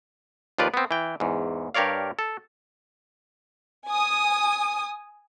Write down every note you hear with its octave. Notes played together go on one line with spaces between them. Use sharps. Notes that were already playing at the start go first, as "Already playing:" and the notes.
D#2 F3 F4 B4 D5
B3 C4
E3 G5
E2 G#2
G2 G4 A#4 C#5 D5 F5
A4
G#5 D#6